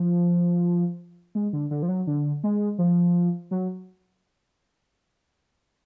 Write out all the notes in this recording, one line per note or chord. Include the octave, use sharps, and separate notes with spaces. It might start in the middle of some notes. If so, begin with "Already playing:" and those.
Already playing: F3
G#3
D3
D3
F3
F#3
D3
G#3
F3
F#3